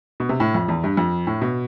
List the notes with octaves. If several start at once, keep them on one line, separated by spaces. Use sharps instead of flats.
B2
C3
A2
F2
E2
G2
F2
A2
B2